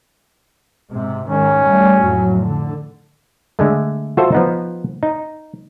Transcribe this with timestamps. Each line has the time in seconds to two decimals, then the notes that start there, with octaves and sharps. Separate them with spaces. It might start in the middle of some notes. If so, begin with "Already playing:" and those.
0.92 G#2 C3
1.29 G#2 D#3 C#4
1.68 G3 A3
1.99 F2 A2 F#3
2.43 D3
3.59 D3 G#3 A3
4.17 F4 F#4 A4 C5 E5
4.32 F3 B3 D#4
5.03 D#4